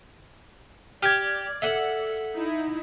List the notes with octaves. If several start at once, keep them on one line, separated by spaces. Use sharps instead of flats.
G4 D5 F6 G#6
A4 E5 F#5
D#4 E4